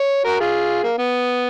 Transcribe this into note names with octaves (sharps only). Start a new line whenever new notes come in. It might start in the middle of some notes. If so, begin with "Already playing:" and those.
Already playing: C#5
F#4 A#4
F4 G#4
A#3
B3